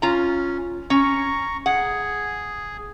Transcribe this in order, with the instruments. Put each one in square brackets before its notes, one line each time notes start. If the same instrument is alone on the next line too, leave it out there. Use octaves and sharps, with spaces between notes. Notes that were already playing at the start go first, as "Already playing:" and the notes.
[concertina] C#4 [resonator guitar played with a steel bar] F4 A#5
[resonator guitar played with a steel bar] C#4 [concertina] A#5 C#6
[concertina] G#4 [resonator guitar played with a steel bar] F#5